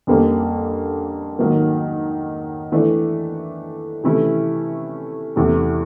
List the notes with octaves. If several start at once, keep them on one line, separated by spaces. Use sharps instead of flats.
F2 D3 G3 A#3 C#4
G#2 D#3 F#3 A#3
E3 A3 D4
C3 E3 A3 C#4 E4
E2 C3 E3 A3 C#4